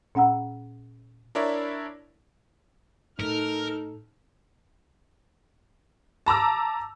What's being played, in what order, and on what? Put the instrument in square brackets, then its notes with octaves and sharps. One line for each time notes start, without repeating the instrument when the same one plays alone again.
[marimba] A#2 C#4 F#5 A#5 E6
[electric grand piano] D4 E4 A#4 C#5 D5 E5
[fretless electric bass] A2 [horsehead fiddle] D#4 [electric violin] A4 F6 [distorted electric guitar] A#4
[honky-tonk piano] A5 A#5 D6 E6